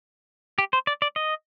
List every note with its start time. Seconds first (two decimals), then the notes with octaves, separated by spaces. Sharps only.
0.58 G4
0.73 C5
0.87 D5
1.02 D5
1.16 D#5